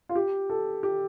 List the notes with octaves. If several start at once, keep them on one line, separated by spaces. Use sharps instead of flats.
F4
G4
A4
G4